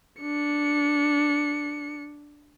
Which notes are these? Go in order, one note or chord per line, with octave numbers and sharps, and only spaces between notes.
D4 C#7